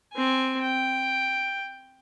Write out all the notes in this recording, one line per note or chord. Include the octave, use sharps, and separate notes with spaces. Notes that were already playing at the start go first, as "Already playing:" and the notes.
C4 G#5
G5